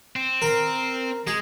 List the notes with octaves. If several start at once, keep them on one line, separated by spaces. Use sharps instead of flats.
C4
A#4 B5
G#3 G#4